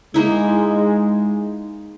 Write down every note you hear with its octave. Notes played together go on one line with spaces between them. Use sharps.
G#3 A#3 D#4 E4